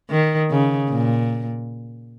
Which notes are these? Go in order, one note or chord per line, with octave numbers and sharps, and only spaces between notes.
D#3
C#3
A#2